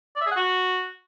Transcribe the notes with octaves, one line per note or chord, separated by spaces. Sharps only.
D5
E5
G#4
F#5
F#4